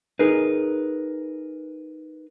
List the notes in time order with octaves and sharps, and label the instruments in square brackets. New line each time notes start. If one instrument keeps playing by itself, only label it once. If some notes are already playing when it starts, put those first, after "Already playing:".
[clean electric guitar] D#4 G#4 A#4 B4